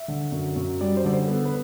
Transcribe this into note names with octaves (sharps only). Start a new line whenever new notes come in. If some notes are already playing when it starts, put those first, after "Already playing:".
Already playing: E5
D3
F#2
F#2
G3 D5
C5
D3 D5
C5
B3 A4
B4